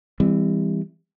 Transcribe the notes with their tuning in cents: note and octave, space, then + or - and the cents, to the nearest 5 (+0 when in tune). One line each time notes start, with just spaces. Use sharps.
E3 +0 G3 +35 C4 -10